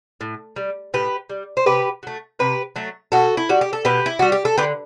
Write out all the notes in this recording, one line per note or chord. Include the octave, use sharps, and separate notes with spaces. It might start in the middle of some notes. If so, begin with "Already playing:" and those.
A2
G3
A2 G4 B4
G3
C5
C3 G4 B4
F#3 A3
C3 G4 B4
F#3 A3
B2 F#4 A4
E4
G3 F#4
G4
A4
B2 G4 B4
E4
G3 F#4
G4
A4
D3 G4 B4